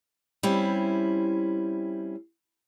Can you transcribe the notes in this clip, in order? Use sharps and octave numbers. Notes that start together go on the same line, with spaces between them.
G3 C4 C#4 E4